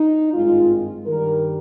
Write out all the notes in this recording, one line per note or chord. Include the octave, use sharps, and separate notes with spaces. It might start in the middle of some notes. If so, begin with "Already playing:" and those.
Already playing: D#4
G#1 G2 D#3 G#3 F4
G2 D#3 G3 A#4